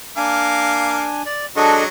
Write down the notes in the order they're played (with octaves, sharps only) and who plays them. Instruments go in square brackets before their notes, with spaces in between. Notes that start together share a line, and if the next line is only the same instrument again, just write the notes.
[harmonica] A#3 F5 [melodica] D4 G#5
[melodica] D5
[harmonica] F#3 G#3 F#4 [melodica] D4 A4 D#5